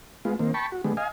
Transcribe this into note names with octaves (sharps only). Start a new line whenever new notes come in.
G#3 B3 F4
D#3 A#3 C4
G5 A5 B5 C#6
F#4
D3 G3 G#3 B3
D#5 F5 G#5